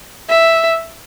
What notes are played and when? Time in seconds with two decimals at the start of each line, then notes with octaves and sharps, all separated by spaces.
0.29 E5